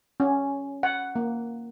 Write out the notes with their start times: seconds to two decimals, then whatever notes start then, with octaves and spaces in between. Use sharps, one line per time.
0.20 C#4
0.83 F#5
1.16 A#3